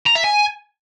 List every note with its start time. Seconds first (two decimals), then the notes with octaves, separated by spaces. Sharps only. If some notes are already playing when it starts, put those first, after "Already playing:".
0.07 A#5
0.16 E5
0.24 G#5